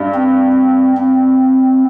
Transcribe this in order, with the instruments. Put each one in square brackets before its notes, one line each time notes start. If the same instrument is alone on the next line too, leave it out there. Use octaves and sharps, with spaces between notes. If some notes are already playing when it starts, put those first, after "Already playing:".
Already playing: [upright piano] G2
[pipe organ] C4
C4